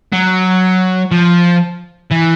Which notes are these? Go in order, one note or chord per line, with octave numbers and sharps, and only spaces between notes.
F#3
F3
E3